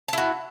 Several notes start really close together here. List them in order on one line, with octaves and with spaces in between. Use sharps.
A5 E4 F#4